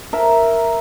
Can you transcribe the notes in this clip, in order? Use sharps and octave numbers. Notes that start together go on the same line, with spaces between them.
A#4 E5